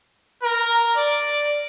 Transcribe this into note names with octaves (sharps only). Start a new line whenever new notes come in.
A#4
D5